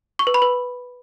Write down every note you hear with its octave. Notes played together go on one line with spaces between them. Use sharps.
C#6
B4
B5
B4